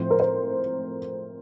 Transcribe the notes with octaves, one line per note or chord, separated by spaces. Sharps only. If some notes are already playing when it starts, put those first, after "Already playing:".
Already playing: A2 F3 C4 C5
A#4
C5